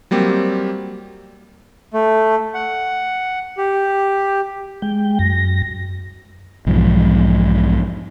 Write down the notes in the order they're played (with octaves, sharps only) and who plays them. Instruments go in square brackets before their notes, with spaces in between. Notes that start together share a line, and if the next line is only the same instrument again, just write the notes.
[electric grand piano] F#3 G3 A#3 C4 G4
[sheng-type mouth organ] A3
F#5
G4
[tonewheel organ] G#3 G5
F#2 A#6
[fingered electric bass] B1 E2 G#2 F3